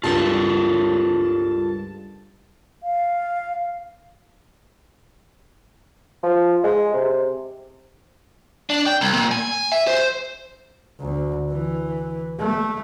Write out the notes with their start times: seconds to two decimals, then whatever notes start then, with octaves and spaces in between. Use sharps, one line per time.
0.04 C#2 G2 F4 A4 A#4 A5
2.83 F5
6.23 F3
6.64 G#3
6.94 C3
8.70 D4
8.86 G5
9.01 C2
9.13 A#2
9.31 G#5
9.72 E5
9.87 C5
11.00 D2
11.50 E3
12.39 A3